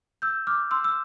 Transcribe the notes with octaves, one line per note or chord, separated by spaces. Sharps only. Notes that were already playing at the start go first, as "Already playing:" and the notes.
E6 G6
D6 F6
C6 E6
E6